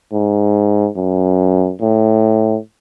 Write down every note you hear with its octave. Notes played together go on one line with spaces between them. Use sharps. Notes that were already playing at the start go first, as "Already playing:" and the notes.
G#2
F#2
A2